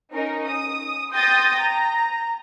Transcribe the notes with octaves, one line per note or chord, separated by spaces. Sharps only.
C#4 D#4 A#4
D#6
G5 C6 D#6 G6 A6 A#6
A#5